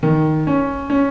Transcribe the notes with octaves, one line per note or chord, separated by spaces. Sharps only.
D#3
C#4
C#4